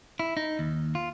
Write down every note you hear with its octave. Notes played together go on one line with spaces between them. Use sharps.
E4
D#4
D#2
F4